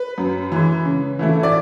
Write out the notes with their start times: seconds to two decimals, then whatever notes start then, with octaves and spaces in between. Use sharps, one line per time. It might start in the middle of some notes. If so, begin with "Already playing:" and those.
Already playing: B4
0.18 F#2
0.52 E3 G#3
0.85 C#3
1.19 E3 A3 E4
1.43 D5